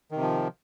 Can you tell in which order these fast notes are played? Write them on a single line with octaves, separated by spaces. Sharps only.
D#3 C3 F3